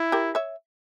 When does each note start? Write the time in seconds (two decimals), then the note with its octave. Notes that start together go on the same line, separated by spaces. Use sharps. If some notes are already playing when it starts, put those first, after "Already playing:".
Already playing: E4
0.12 G4 A#4
0.35 C#5 E5